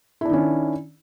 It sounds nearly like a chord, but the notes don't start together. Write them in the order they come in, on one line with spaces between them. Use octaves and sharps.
E4 D4 D#3 C#4